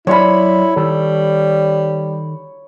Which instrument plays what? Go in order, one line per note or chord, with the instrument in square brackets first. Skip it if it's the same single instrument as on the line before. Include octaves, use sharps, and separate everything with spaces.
[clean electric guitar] F#3 D5 C6 [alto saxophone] E4 [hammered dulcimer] C#5 B5
[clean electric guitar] D#3 A4 [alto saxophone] G3